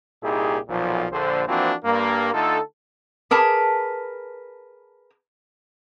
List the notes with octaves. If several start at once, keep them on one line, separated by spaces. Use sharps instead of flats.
C2 A#2 D#4 E4 G4 G#4
B1 A#2 F3
A#1 D3 C5
E3 F3 A#3 C4 D4 F#4
G2 A#3
D3 A3 D#4 F4 A4
G#4 A#4 B4 A5